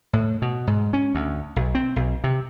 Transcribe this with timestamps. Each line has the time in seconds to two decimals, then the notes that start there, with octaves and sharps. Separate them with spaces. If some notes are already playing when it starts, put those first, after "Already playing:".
0.13 A2
0.42 B2
0.67 G#2
0.93 C#4
1.15 D2
1.56 B1
1.75 C4
1.96 B1
2.24 C3